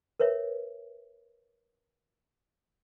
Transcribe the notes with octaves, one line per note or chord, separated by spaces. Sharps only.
A#4 B4 C#5 E5